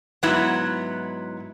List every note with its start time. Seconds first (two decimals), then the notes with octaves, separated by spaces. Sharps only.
0.23 G#2 F#3 B3 E4